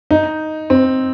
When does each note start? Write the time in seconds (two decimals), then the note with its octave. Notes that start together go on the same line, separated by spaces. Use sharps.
0.11 D#4
0.70 C4